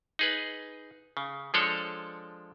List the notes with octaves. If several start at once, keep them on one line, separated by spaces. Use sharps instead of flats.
D#4 G#4 B4
C#3
F3 G#3 D4 A4 C#5